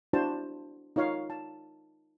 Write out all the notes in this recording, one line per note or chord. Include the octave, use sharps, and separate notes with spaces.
D4 E4 F#4 C5 A5
D#4 F4 C#5 F5 C#6
A5